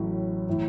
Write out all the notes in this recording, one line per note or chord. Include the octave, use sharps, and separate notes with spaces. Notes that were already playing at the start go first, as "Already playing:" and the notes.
Already playing: A1 A2 F#3
A2 E3